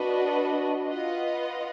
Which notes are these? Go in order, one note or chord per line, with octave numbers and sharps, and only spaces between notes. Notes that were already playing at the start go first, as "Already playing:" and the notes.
Already playing: D4 F#4 B4 D#5
F4 B4 D#5 F#5